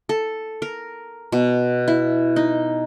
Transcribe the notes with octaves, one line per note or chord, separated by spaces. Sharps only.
A4
A#4
B2
E4
D#4